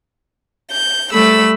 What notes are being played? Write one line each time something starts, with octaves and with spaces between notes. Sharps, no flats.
G6
G3 A3 B5 E6